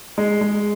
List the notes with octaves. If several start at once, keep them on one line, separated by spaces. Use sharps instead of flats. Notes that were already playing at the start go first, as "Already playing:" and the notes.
G#3
G#3